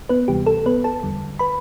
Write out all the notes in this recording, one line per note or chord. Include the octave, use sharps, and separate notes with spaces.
B3 B4
D2 C3 E3 G3 G4
A4
B3 B4
A4 A5
E2 D3 G3
B4 B5